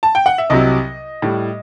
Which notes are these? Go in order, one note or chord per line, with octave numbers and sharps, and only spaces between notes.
A5
G5
F#5
E5
C2 C3 F#3 D#5
A2 G3